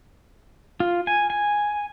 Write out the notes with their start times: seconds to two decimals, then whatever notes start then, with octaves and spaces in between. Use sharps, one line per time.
0.80 F4
1.07 G#5
1.30 G#5